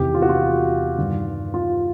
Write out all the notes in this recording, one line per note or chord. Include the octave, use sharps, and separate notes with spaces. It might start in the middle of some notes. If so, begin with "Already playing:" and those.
Already playing: E2 C3 D#3 G4
F4
F#4
F4
G2 D#3
F4